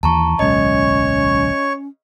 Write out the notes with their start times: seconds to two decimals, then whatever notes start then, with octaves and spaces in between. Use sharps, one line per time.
0.03 D#2 E3 A5 A#5 C#6
0.39 D1 B1 G#3 C#4 C#5 D#5 C#6